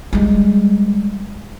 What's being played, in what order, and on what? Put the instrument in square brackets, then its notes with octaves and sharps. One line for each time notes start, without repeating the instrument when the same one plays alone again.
[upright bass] G3 G#3